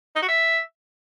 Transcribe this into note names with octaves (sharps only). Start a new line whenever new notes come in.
D#4
F#4
E5